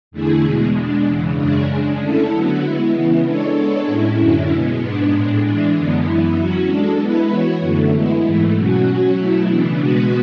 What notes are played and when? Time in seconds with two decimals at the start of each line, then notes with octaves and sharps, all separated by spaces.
0.11 E2 D3 A3 E4 G#4
0.43 E2 B2 G#3
0.74 B2 G#3 D4
1.05 E2 C#3 E3
1.36 F#2 C#3 G#3 D4 G#4
1.68 C#3 G#3 D4
1.99 D3 A3 C#4 E4 A4
2.30 D3 F#3 B3 F#4
2.61 G#3 B3 E4
2.92 C#3 E3 B3
3.24 G#3 D4 A4 C#5
3.55 G#3 B3 D4 A4 C#5
3.86 A2 G#3 C#4 E4
4.18 F#2 D3 F#3 C#4 E4
4.49 B2 G#3 B3
4.80 G#2 G#3 B3 D4
5.11 A2 G#3 D4
5.42 E3 G#3 D4
5.73 F#2 D3 G#3 B3
6.05 F#2 E3 B3 E4
6.36 F#3 C#4 F#4
6.67 G#3 D4 A4
6.99 G#3 B3 E4 B4
7.30 E3 B3 F#4 C#5
7.61 F#2 D3 A3
7.92 G#3 B3 E4
8.23 G#2 E3 A3
8.55 B2 F#3 C#4 F#4
8.86 F#3 C#4 F#4
9.17 B2 F#3 A3 E4
9.48 C#3 E3 B3 D4
9.79 B2 G#3 B3 F#4 B4